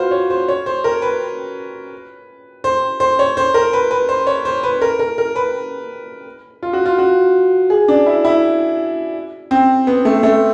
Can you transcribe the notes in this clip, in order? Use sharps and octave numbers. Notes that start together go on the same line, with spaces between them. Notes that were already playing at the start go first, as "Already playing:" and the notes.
Already playing: F4 F#4 B4 C5
C#5
C5
C#5
C5
A#4
B4
C5
C5
C#5
C5
A#4
B4
B4
C5
C#5
C5
B4
A#4
A#4
A#4
B4
F4
F#4
F4
F#4
G#4
D4
E4
E4
C4
B3
A3
A3